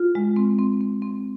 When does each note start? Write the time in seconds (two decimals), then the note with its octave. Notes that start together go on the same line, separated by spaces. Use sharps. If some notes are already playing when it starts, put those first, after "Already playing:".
Already playing: F4
0.15 G#3
0.36 C4
0.59 C4
0.81 C4
1.02 C4